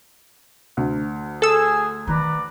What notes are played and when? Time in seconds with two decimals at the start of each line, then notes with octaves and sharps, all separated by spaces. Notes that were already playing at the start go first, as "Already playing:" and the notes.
0.77 D2
1.42 G#4 A4 E6
2.07 D#3 A3 B4 D5 A#5